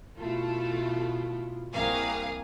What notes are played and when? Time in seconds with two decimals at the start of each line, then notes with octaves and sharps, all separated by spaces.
0.18 B2 A3 E4 F4 A4
1.72 C2 A#3 G#4 F5 D#6